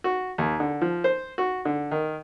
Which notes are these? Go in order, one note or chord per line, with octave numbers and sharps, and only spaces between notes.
F#4
D#2
D3
F3
C5
F#4
D3
D#3